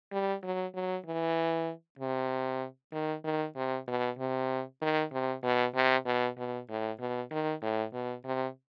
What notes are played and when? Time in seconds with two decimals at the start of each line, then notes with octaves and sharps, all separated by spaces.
0.12 G3
0.43 F#3
0.74 F#3
1.05 E3
1.99 C3
2.93 D#3
3.24 D#3
3.56 C3
3.87 B2
4.18 C3
4.81 D#3
5.12 C3
5.43 B2
5.75 C3
6.06 B2
6.38 B2
6.69 A2
7.00 B2
7.31 D#3
7.62 A2
7.93 B2
8.24 C3